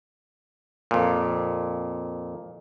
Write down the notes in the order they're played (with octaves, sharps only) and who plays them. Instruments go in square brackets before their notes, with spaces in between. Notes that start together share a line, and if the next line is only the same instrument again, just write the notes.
[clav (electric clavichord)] F2 A#2